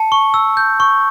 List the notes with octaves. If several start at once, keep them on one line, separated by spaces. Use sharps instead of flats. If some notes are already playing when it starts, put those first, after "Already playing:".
Already playing: A5 C#7
C#6
E6
G6
C#6